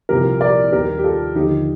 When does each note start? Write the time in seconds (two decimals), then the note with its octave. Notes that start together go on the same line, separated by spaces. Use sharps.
0.09 C2 A#2 F3 G4 A#4
0.40 A#4 D5
0.72 D#2 D#3 G3 G4 A#4
0.98 G4
1.04 F4 A4
1.35 D#2 D3 F3 D#4 G4